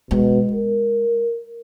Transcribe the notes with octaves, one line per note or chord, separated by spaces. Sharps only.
B2 G#3
A#4